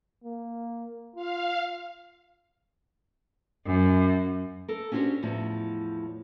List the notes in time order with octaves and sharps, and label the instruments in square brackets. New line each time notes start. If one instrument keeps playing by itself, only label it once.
[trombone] A#3
[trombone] F4 [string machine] F5
[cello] F#2
[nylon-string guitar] A4 A#4
C#4 D4 F#4 G4 C5
E2 A2 F3